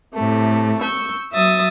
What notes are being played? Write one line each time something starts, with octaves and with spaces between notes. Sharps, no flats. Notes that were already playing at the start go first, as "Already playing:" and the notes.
A2 C3 A3
C#6 E6 G6
F#3 E5 D#6 A6